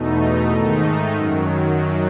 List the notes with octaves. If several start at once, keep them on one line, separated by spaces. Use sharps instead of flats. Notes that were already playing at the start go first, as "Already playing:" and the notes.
Already playing: E2 B2 A3 D#4
G#2 D#3 A3 D#4
F#2 D#3 F#3